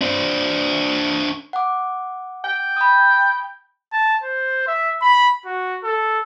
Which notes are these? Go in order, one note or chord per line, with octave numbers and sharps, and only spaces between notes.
D4 C5
F#5 D6
G5
B5 D#6
A5
C5
E5
B5
F#4
A4